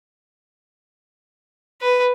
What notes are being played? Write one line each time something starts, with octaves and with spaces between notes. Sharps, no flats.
B4